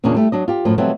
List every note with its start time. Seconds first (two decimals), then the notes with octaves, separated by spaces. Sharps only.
0.04 E2 A#2 C#3 A#3 C#4 D4
0.15 G3 A3 G4
0.32 F#3 D4 D#5
0.48 F4 G4
0.65 F#2 A2 F3
0.78 B2 E3 F#3 G3 A3 C4